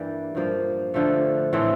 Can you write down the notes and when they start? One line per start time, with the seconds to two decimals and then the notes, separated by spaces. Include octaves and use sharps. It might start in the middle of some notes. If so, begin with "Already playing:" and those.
Already playing: G2 E3 G3 A#3
0.35 G2 F3 A#3
0.94 D3 F3 A3
1.53 A2 E3 A3 C4